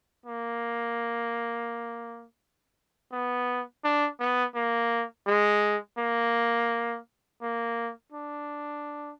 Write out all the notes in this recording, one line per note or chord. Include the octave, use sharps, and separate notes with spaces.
A#3
B3
D4
B3
A#3
G#3
A#3
A#3
D4